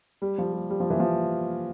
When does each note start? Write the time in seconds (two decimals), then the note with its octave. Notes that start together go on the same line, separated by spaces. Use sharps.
0.22 G3
0.38 F3
0.53 G3
0.70 G3
0.80 F3
0.90 E3
1.00 F3